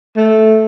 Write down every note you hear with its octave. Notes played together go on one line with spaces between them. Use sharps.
A3